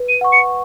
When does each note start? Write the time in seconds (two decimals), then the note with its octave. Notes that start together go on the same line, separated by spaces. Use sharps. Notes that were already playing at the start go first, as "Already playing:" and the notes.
Already playing: B4
0.09 D#7
0.21 F#5 C#6
0.32 C#7